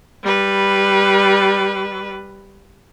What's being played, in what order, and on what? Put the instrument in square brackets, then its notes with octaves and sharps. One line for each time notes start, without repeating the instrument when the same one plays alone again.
[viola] G3 B4